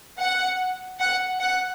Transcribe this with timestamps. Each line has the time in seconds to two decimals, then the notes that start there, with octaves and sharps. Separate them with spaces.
0.20 F#5
1.00 F#5
1.40 F#5